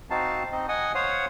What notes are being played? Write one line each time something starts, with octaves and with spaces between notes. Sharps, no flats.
C4 D#4 F#4 F5 A5
C4 D#4 D#5
D#5 F#5 G#5 D#6
C5 C#5 F5 F#5 D#6